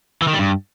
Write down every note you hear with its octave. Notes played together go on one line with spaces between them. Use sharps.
E3
D#3
G3
G2